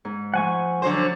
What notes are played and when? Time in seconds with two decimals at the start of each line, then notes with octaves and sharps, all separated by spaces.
0.05 G#2
0.34 F3 A3 F#5 G#5 C#6
0.82 D3 F#3 C5